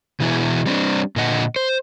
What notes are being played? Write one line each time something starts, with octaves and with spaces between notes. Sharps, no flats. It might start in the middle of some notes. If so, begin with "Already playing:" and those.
B2 E3 B3 E4 G#4
G3 C4 D4
A#2 D3 D#5 F#5
C5